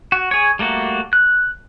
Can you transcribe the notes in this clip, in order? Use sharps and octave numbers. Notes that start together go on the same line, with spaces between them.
F#4
G#4 C#5
G3 A3 A#3 F#4
F#6